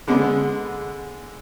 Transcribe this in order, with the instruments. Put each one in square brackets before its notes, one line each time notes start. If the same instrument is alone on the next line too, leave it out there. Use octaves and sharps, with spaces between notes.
[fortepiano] D3 G#3 B3